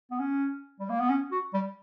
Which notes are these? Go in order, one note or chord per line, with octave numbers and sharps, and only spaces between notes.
B3
C#4
G3
A#3
B3
C#4
F#4
G3